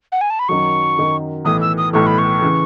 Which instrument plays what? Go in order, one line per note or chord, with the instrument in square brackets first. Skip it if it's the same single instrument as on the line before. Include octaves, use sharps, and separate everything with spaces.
[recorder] F#5
G#5
A5
B5
[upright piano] F#2 D#3 F#3 [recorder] C#6
[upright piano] F#2 D#3 F#3
[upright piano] B1 A2 E3 [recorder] D#6
[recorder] E6
D#6
[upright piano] B1 A2 E3 [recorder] C#6
[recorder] B5
C#6
[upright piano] C#3 E3